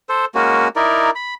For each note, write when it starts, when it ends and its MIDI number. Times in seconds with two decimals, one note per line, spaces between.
0.09 0.25 69
0.09 0.25 72
0.35 0.68 56
0.35 0.68 58
0.35 0.68 61
0.35 0.68 66
0.76 1.10 63
0.76 1.10 64
0.76 1.10 70
0.76 1.10 74
1.15 1.34 83